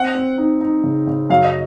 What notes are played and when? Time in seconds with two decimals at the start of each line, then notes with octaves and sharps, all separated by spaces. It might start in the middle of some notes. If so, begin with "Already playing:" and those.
Already playing: C4 F#5
0.15 C4
0.38 D#4
0.61 D#4
0.84 C#3
1.07 C#3
1.30 F#2 F5
1.44 D#5